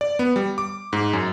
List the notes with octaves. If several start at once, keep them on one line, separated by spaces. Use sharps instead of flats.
D5
B3
G3
D6
G#2
F#2